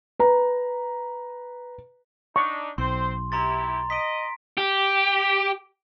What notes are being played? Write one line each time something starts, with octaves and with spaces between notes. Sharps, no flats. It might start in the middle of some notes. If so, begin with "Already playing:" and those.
B4 A#5
D4 D#4 C#6
B1 C4 C5 C6
C3 E4 G4 A#5 C6 A6
D#5 B6 D7
G4